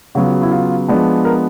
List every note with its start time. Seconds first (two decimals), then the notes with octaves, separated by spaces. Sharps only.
0.15 C#3 F#3 B3 F#4
0.24 F4
0.33 F#4
0.42 E4
0.52 F4
0.88 F3 G#3 B3 D4
1.25 A#4